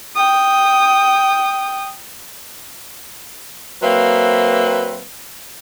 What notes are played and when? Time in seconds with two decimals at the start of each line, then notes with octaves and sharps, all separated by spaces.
0.15 G5 D#6
3.83 F#3 A#3 C4 B4 E5 F5